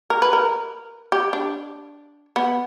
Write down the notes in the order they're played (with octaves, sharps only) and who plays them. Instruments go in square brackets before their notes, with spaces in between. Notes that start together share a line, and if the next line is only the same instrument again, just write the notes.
[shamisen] A#4
B4
A#4
G4
D4
B3